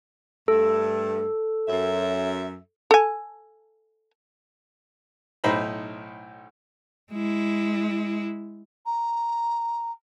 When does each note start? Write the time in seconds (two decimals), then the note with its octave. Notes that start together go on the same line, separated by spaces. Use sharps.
0.48 G2 A3 A4
1.68 F#2 E5
2.91 A4 G#5
5.44 B1 A2 D#4 C5 A#5 B5
7.12 G#3 E4
8.86 A#5